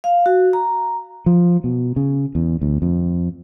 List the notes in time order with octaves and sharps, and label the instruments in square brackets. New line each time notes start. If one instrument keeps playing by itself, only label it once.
[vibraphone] F5
F#4
A#5
[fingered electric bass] F3
B2
C#3
E2
D2
F2